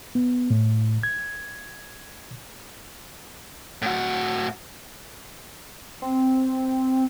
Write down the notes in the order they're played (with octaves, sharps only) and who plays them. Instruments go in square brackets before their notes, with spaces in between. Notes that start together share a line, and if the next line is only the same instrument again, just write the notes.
[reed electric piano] B3
A2
G#6
[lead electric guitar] A2 F#4
[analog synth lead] C4